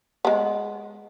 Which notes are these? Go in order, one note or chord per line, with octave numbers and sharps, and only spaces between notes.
G#3 B3